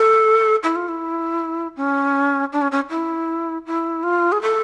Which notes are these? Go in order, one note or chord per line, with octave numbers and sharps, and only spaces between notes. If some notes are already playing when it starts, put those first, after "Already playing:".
Already playing: A4
E4
F4
E4
C#4
D4
C#4
C#4
E4
E4
F4
G#4
A4